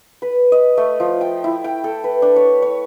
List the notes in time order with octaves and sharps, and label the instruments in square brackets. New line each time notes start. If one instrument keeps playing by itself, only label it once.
[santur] B4
D#5
A3
F3
G5
E4
G5
A4
B4
D4
C#5
C#5